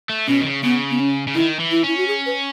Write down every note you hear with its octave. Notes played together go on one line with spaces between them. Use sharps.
A3
B2 C#4
D#3
C#3
C#3 B3
B3
C#4
C#3
D#3 E4
E3
E4
C#4 E4
F#4
G#4
B4